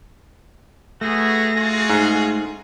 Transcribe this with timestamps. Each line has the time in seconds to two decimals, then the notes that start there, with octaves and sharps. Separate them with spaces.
1.01 A3 B3 F#4 G#4 A#6
1.55 F4 F#4 G#4
1.90 G#2